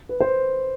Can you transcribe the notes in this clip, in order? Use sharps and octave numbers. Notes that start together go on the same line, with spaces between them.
B4
C5